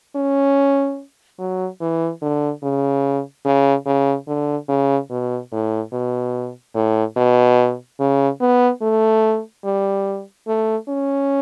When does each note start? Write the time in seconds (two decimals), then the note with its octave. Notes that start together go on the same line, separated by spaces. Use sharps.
0.16 C#4
1.39 F#3
1.81 E3
2.22 D3
2.63 C#3
3.45 C#3
3.86 C#3
4.27 D3
4.69 C#3
5.10 B2
5.52 A2
5.93 B2
6.75 A2
7.17 B2
8.00 C#3
8.41 B3
8.82 A3
9.65 G3
10.48 A3
10.88 C#4